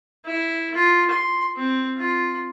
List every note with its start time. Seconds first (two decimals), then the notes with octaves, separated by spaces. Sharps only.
0.25 E4
0.75 F4
1.11 C6
1.57 C4
1.97 F4